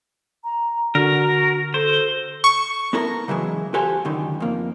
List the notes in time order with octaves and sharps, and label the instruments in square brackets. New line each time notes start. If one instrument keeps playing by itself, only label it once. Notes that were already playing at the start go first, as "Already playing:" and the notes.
[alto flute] A#5
[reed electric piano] D3 [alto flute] F#4 [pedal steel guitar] A#4
[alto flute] A4 [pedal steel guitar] C5
[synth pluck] C#6
[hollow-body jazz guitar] B3 E4 A4 A#4
C#3 E3 F#3 G#3
F#4 G4 A4 C5 F5 G#5
C#2 F#2 D3 D#3
F2 A#3